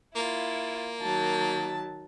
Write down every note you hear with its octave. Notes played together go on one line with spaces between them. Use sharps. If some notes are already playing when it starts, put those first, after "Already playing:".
A#3 E4 F4
D#3 F#3 A5